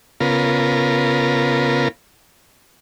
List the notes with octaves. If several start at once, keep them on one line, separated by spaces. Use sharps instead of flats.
C#3 B3 F4 A#4